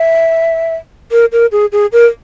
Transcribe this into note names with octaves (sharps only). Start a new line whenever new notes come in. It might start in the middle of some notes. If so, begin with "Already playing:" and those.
Already playing: E5
A#4
A#4
G#4
G#4
A#4